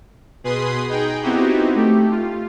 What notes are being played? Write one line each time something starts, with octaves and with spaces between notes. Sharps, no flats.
B2 G#4 B4 C6 D#6
D#4 G#4 G5
B3 C4 D#4 E4 F#4 G4
A3 G4
F4